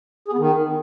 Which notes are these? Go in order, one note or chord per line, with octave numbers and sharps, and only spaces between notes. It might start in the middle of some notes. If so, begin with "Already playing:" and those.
G#4
B3
D#3